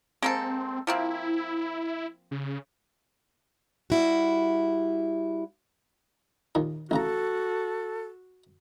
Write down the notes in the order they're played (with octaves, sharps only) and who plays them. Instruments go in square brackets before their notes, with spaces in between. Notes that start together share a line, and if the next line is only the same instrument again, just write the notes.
[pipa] G#3 A#3 A4 [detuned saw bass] C4
[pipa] F3 A#3 C4 [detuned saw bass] E4
[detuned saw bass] C#3
[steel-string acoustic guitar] G3 E4 F#4
[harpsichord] D#2 A#2
[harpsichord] A1 C#3 A#5 [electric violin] F#4 [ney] A4